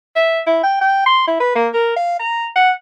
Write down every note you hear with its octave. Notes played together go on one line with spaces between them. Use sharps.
E5
E4
G5
G5
C6
E4
B4
A#3
A#4
F5
A#5
F#5